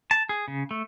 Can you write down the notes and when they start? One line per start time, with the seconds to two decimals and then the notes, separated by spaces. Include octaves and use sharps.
0.11 A5
0.29 G#4
0.48 C#3
0.71 A3